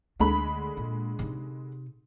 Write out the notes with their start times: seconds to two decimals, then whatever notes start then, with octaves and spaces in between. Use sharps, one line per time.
0.20 D2 D3 G#3 B5
0.77 A#2
1.19 C3 D#4